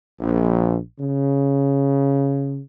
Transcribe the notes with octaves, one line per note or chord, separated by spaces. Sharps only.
A#1
C#3